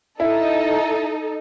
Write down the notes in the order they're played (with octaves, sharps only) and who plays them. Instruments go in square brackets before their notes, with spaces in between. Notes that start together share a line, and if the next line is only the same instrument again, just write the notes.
[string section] D#4 A4 [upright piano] E4